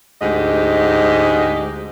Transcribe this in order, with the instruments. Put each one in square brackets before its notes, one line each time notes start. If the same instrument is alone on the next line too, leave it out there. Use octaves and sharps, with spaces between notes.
[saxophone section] D2 G#2 G4 D#5